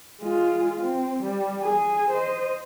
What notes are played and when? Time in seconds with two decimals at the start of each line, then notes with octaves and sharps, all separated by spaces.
0.22 G#3 F4
0.81 C4
1.23 G3
1.63 G#4
2.11 C5 D#5